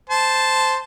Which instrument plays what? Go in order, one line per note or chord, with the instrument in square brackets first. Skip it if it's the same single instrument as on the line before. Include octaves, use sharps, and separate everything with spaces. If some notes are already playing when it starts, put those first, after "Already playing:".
[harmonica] C5 A5